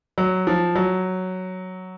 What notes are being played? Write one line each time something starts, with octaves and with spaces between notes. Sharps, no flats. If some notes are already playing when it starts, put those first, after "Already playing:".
F#3
F3
F#3